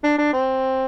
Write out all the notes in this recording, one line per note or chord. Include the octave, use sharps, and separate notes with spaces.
D4
D4
C4